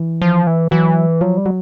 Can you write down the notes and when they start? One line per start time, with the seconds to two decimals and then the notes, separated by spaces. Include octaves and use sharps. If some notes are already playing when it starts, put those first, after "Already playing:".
Already playing: E3
0.22 F3
0.47 E3
0.71 E3 F#3
1.21 F3 F#3
1.37 G3
1.46 F#3